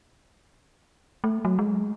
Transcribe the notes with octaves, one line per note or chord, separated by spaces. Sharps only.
A3
F#3
G#3